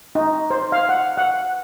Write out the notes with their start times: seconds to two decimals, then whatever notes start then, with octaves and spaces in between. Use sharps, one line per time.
0.15 D#4
0.50 C5
0.72 F5
0.89 F#5
1.18 F#5